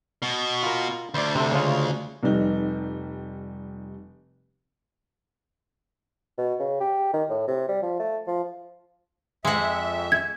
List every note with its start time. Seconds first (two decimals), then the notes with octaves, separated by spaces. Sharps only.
0.22 B2
0.63 F4 A#4
1.14 D2 C5 D5
1.35 C3 C4 A4
1.52 C#3 G#3 F4
2.23 F1 G3 D#4
6.38 B2
6.59 C#3
6.80 G4
7.13 D#3
7.30 A2
7.48 C3
7.69 G3
7.82 F3
8.00 A3
8.27 F3
9.45 F2 G#3 E5 F#5
10.12 G#6